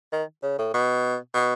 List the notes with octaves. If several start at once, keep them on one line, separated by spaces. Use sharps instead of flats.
D#3
C#3
A2
B2
B2